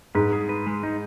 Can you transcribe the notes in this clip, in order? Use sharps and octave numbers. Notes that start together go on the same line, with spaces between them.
G#2 B4
G#4
B4
G#3
D#4